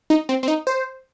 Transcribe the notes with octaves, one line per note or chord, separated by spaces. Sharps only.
D#4
C4
C4
D#4
C5